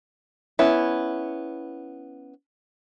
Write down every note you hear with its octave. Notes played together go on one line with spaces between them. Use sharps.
B3 C#4 E4